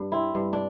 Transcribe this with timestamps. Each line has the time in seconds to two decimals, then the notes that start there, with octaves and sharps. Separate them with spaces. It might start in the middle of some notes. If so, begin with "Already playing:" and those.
Already playing: G2
0.12 C4 E4
0.35 G2
0.53 D4